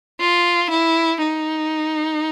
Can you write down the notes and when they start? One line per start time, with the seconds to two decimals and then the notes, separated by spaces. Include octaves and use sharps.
0.20 F4
0.71 E4
1.22 D#4